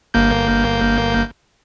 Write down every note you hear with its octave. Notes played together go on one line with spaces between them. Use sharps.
G1 A#3 G6